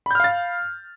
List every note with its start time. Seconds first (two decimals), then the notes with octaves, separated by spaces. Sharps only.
0.06 B5
0.11 G6
0.15 F6
0.20 F5
0.24 A6